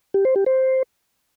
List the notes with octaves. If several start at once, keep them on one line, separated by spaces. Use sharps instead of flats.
G4
C5
G4
C5